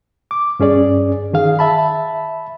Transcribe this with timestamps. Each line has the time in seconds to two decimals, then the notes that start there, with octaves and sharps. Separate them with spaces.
0.31 D6
0.60 G2 C#4 G#4 D5
1.33 D#3 G#4 F5
1.59 E5 A5 B5